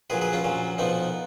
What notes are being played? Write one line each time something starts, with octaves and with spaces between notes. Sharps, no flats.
A#1 A#2 F#3 G#4 B4
G#4 B4
C#4 F4
A#1 A#2 F#3
B1 A#2 F3 B3 D#4